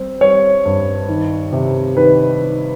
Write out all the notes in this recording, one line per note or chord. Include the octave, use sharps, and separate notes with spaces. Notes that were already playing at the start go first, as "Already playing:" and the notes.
Already playing: G3 C4
G3 C#5
G2
D#3
C3
D#3 B4
D#3